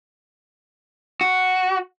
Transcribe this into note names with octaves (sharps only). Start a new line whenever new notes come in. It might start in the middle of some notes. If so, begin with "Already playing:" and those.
F#4